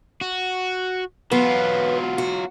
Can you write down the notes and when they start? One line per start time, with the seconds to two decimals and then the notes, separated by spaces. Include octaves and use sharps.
0.21 F#4
1.32 F#3 B3 F4
2.18 F#4